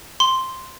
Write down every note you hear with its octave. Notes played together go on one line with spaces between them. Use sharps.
C6